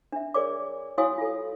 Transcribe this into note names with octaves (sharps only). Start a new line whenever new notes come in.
D4 E5
G#4 A#4 C#5 D5 D6
E4 F#4 C#5 F5 G#5 D#6
F4 A4